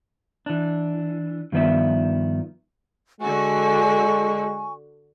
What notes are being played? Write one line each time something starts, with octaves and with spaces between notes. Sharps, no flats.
E3 D4
G2 D#3 F3 B3 D5 E5
D3 G#3 F#4 G#5 C#6